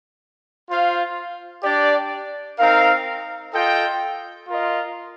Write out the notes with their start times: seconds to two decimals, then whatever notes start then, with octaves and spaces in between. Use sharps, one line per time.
0.69 F4 C5 F5
1.64 D4 G4 D5
2.59 C4 D#4 A#4 F5
3.53 F4 A4 D#5 G5
4.48 F4 A#4 D#5